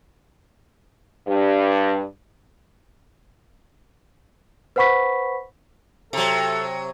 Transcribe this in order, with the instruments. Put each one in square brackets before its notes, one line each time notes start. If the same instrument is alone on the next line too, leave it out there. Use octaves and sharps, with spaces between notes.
[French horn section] G2
[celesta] B4 C5 F#5 B5 C#6 B6
[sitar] C3 F#3 [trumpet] A4